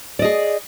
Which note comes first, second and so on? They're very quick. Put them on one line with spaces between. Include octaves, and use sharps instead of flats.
D5 D#5 G#4